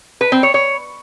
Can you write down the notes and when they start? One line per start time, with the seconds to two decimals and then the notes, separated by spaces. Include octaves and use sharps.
0.21 B4
0.32 C4
0.43 C#5
0.54 C#5